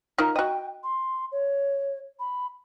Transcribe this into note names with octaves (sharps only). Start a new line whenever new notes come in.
D#4 F4 A#4
F#4 D#5 G5
C6
C#5
B5